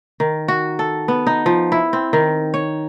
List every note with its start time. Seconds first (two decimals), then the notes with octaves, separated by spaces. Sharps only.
0.20 D#3
0.48 F#4
0.79 A4
1.08 B3
1.27 D#4
1.46 F3
1.72 E4
1.93 C4
2.13 D#3
2.54 C#5